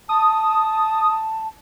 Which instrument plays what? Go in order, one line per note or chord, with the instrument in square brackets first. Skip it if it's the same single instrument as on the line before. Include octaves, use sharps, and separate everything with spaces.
[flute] A5 [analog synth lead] D#6